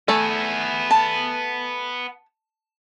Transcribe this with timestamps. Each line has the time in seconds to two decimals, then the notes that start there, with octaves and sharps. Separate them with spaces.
0.08 A3 B3 A4 G#5
0.91 A5